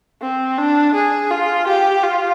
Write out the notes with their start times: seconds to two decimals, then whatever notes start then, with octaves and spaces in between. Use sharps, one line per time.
0.21 C4
0.58 D4
0.95 G#4
1.31 F4
1.68 G4
2.03 F4